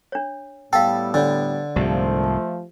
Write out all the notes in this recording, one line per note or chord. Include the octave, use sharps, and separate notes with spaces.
D4 C#5
A2 G3 B3 A4 F5 G5
D3 D4 C#5
C2 G#2 C3 F3 A3 G4